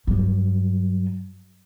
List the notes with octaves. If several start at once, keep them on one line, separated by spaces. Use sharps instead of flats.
G2 F#3